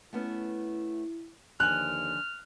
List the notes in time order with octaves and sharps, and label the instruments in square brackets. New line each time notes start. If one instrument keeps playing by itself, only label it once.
[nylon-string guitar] A3 B3 C#4 [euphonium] E4
[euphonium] D#2 [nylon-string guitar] D3 F3 G#5 [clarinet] F6 [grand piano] F#6